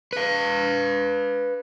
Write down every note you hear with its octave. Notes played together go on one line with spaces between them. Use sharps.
B4 F5